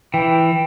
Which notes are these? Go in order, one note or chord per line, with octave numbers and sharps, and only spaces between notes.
E3 G5